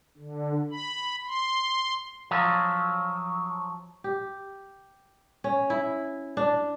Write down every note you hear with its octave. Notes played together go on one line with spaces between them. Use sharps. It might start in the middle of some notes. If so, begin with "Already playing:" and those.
D3
B5
C6
F3 F#3
G4
C#4
E4
D4